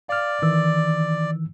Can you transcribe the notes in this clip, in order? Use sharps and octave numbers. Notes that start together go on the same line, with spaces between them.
D5 F5 F6
D#3 E3 E6